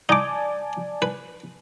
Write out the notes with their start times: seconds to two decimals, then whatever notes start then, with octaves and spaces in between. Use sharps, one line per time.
0.09 D#4 D5 G#5 A5 D6
1.02 B4